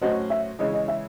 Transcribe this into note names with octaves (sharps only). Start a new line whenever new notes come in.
A2 F#3 C#4 F#4 C5 D#5
E5
C#3 E3 G#3 C#4 D#5
D#5
E5